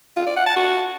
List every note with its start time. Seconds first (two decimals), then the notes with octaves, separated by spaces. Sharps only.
0.17 F4
0.26 D5
0.36 F#5
0.46 A5
0.56 F#4